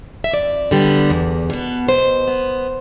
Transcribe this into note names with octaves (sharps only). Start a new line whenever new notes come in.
E5
F2 D5
D3 G3 B3
E2
B2 B3
B2 C5
B3